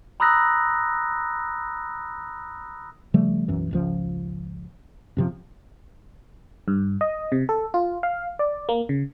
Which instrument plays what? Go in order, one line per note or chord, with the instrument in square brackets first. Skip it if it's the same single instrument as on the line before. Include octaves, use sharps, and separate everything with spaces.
[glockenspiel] A#5 B5 D#6 E6 F#6 A#6
[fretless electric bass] C#3 F3 G3 A3
B1 F#2 E3
G#1 C#2 F3
F#2 C3 F3
[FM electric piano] G2
D#5
C3
A4
F4
F5
D5
A#3
C#3